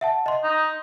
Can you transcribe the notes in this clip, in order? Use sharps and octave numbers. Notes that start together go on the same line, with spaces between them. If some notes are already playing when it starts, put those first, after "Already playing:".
E5 F#5 A5
D#5 C6
D#4